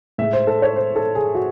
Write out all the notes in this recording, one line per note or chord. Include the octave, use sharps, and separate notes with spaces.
A2 G#3 E5
C5
A4
C#5
C5
A4
G#4
F#4